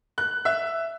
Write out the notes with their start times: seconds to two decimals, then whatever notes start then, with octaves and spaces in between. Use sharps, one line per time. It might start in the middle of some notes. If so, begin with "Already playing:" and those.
0.18 F#6
0.45 E5